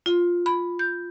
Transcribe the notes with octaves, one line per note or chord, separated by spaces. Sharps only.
F4
B5
G6